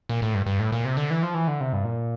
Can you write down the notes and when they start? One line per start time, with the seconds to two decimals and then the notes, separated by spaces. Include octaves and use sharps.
0.09 A#2
0.22 A2
0.34 G2
0.46 G2
0.59 A2
0.72 A#2
0.85 C3
0.97 D3
1.10 E3
1.23 F3
1.34 E3
1.48 D3
1.61 C3
1.73 G2
1.84 A#2